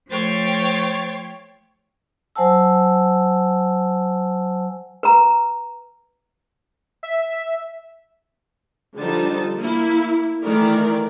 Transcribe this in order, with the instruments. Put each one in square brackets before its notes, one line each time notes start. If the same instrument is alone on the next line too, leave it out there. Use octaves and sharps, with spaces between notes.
[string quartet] F3 A3 C5 C#5 G5 A6
[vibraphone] F#3 C5 F#5 G#5 A5 E6
[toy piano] B4 A#5
[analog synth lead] E5
[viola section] D3 F3 G3 D#4 A5
A#3 E4
D#3 E3 A3 A#4 D5